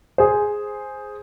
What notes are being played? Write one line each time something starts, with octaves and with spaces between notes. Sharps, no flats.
G#4 C5